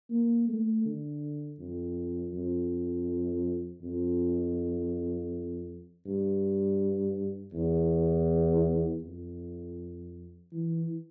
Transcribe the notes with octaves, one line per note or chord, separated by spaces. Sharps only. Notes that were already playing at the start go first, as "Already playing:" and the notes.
A#3
A3
D3
F2
F2
F2
G2
E2
F2
E3